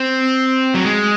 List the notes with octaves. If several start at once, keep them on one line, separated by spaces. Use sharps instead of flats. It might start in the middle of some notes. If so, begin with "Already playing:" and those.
Already playing: C4
F#3
G#3